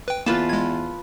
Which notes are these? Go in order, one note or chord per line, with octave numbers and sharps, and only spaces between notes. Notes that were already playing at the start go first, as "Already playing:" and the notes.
B4 G5
E2 A#3 F4 B4 A5
G#3 G#6